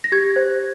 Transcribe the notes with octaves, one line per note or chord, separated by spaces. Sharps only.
A#6
G4 G#6
C5